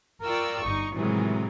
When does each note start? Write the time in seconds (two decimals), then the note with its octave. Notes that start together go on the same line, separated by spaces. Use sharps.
0.23 F4 A#4 D5 G5 C#6 E6
0.62 G1 D#4 C#6
0.93 A2 C3 D#3 E3 F#3 G#3